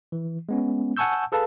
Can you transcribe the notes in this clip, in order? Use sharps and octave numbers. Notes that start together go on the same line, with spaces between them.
E3
G#3 B3 C#4
F#5 G#5 A5 C#6 E6 G6
G#4 A4 B4 F5 A5